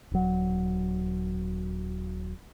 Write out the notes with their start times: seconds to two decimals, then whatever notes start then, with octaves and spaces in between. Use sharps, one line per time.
0.12 D#1 F#3